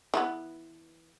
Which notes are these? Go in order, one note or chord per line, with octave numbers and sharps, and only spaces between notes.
E3 F3 B3